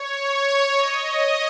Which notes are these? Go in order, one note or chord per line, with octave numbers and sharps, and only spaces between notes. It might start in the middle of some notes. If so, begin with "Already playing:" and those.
Already playing: C#5
D#5